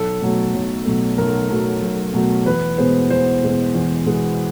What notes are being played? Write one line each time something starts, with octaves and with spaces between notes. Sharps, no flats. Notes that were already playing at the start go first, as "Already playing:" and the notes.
Already playing: B1 A4
B2 F#3 A3
B1
B2 F#3 A3
B1 A#4
B2 F#3 A3
B1
B2 F#3 A3
E2 B4
B2 G#3 B3 C5
E2 C5
B2 G#3 B3
E2
B2 G#3 B3